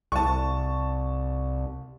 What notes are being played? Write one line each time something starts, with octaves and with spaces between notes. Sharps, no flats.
C2 A5 C#6